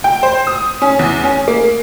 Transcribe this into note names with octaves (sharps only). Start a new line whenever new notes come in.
G5
C5
D#6
C#4
E2
C#4
A#3